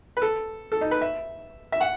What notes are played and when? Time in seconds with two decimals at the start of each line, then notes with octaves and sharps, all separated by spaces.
0.17 B4
0.22 A4
0.72 A4
0.81 D#4
0.91 B4
1.01 E5
1.72 E5
1.81 F#5